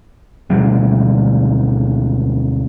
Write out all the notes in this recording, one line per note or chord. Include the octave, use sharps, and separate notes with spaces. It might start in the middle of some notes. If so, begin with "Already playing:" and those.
D2 B2 G3 G#3